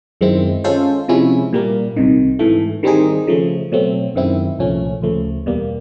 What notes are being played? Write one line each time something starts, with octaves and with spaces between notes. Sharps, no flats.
F#2 D#3 G#3 C4 E4
G#3 C#4 F4 A4 C5
C3 F3 G#3 C#4 E4
A#2 G3 A#3
C2 C3 D#3
G#2 E3 A3
D#3 G3 C4 D#4 G#4
C#3 F3 A3
B2 F#3 A3 C4
F#2 D#3 G#3 C4 E4
C2 A#2 F3 A3 C#4
D2 C#3 F3 A3
E2 B2 G3 A#3